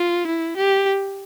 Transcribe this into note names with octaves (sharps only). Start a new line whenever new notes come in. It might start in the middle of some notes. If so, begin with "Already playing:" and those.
Already playing: F4
E4
G4